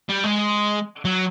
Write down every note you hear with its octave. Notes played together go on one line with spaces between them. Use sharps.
G3
G#3
F#3